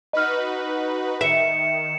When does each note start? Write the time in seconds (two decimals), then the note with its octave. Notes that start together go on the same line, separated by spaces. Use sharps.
0.13 D#4 F#4 B4 D#5 F6
1.21 D#3 E5 C#7 E7